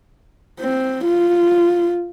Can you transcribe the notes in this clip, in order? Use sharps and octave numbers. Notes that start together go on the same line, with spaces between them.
C4
F4